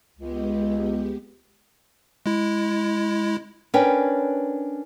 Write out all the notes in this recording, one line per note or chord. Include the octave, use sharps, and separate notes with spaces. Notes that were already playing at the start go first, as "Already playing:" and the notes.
C#2 G#3 B3 G4
G#3 E4
C#4 D4 A#4 B4 C#5 G5